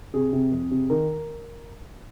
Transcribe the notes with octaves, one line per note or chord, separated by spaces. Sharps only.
C3 G#4
C3
F2
C3
D#3 A#4